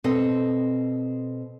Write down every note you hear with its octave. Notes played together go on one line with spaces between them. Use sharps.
B2 C4 A4 D#5